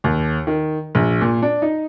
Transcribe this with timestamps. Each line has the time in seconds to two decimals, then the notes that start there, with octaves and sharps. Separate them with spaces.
0.04 D#2
0.47 D#3
0.95 A#1
1.21 A#2
1.42 D4
1.62 D#4